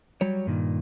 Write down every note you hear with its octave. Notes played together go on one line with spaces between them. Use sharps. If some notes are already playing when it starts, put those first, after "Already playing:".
F#3 G3 C#5
G2 A#2 D#3